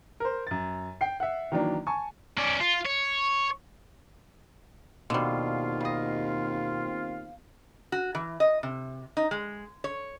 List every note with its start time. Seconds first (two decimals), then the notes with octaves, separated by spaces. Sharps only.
0.20 A#4 C5
0.47 F#2 A6
1.01 G5 C7
1.20 E5 F#5
1.52 D#3 E3 F#3 A#3 D4
1.87 G#5 A5 C#6
2.38 C#4 D5
2.61 F4
2.85 C#5
5.10 D#2 B2 D3 G3 C4 F4 F5
5.80 G3 D#5
7.92 F#4
8.15 E3
8.40 D#5
8.63 C3
9.17 D#4
9.31 G#3
9.84 C#5